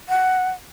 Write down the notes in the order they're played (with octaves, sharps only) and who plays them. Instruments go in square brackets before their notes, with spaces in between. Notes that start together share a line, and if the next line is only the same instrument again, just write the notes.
[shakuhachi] F#5